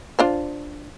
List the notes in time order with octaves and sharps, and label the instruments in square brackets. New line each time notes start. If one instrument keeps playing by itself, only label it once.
[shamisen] D4 F4 C5